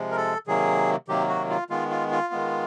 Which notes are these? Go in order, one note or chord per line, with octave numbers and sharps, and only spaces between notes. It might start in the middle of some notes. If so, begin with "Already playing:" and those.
Already playing: C3 F3 G#3
A#4
A4
C3 D#3 F#3 A#3 G#4
C3 D#3 F#3 A#3 G4
F#4
F4
D#3 G#3 B3 F4
F4
F4
D#3 G#3 B3